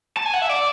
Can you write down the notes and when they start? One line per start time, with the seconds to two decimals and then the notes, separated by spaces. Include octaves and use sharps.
0.17 A5
0.26 G#5
0.34 F#5
0.42 E5
0.49 D5